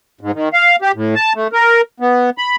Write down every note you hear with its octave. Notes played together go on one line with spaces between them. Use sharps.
G#2
D#3
F5
G4
A2
A5
A3
A#4
B3
B5